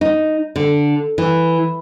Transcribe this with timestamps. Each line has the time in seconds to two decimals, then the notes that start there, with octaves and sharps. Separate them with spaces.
0.01 D#4
0.56 D3
1.18 E3